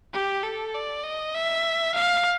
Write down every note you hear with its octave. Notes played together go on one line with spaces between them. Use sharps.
G4
A4
D5
D#5
E5
F5